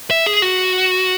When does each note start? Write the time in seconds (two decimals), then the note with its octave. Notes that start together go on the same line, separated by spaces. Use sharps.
0.11 E5
0.26 G#4
0.42 F#4